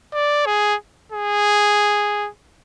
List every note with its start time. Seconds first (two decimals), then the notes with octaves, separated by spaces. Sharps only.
0.13 D5
0.46 G#4
1.12 G#4